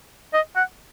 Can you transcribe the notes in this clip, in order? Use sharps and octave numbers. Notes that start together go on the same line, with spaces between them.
D#5
F#5